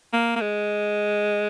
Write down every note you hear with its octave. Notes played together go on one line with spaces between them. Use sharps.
A#3
A#3
G#3